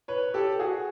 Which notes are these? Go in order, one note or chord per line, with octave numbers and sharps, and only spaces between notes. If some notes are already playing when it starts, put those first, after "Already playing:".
B4 C#5
G4 A4
F#4 G#4